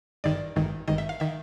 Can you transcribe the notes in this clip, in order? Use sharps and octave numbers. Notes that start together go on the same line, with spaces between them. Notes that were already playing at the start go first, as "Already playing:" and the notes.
G#1 G2 D#3 D5
G#1 G2 D#3
G#1 G2 D#3 D#5
E5
F5
D#3 E5